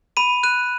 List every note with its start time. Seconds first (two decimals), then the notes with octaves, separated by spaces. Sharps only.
0.17 B5 D#7
0.43 F#6 D#7